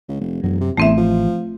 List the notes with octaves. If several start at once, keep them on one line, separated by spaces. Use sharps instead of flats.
C#2
F1
E1 F#2 F#3
C3
A1 E2 A3 C4 E5
F3